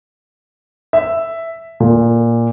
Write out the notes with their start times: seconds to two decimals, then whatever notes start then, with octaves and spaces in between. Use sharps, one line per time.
0.93 E5
1.80 A#2